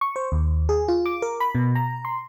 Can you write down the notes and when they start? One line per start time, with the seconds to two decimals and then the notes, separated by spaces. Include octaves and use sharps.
0.01 C#6
0.16 C5
0.32 D#2
0.69 G#4
0.88 F4
1.06 D6
1.22 A#4
1.40 B5
1.55 B2
1.75 A#5
2.05 C6